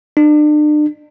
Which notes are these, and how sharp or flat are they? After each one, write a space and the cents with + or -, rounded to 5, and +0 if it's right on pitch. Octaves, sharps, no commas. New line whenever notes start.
D4 +40